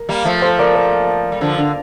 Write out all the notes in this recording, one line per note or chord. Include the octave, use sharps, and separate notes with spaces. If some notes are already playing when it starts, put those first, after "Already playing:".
Already playing: A#4
G3 A#3
F3 A3
A4 C5
A#4 D5
A#4
G3
D3 F3
D3